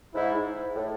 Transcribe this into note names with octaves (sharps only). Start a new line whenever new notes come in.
G#2 E4
A2